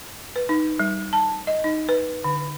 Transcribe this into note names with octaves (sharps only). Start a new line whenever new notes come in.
B4
D#4
G3
A5
D#5
D#4
B4
D3